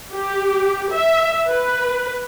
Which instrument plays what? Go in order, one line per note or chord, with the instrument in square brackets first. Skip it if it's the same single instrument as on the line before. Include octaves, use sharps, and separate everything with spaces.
[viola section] G4
E5
B4